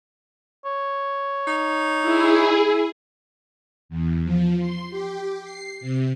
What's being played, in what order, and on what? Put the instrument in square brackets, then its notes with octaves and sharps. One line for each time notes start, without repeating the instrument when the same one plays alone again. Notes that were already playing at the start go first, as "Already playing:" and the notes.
[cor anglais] C#5
[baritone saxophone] D#4
[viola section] E4 [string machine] G#4
[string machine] E2
F3
C6
G4
C7
C3